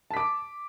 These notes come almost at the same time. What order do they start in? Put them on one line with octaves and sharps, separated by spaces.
A5 B6 D6